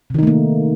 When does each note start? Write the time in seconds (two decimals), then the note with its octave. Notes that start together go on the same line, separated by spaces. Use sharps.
0.10 C3
0.14 D#3
0.19 D#4
0.23 A3
0.27 A#3